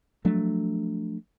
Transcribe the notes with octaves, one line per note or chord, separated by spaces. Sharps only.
F3 F#3 A3 D4